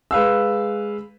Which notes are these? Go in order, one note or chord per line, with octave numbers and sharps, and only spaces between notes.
G#3 B4 F5 E6